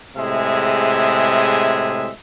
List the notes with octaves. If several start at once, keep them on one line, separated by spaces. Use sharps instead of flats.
A2 C3 G#3 G#4 E5